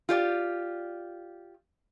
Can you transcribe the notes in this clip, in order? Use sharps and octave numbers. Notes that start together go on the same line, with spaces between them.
F4 G4 D5